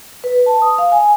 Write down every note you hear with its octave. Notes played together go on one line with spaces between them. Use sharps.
B4
A5
D#6
F5
G#5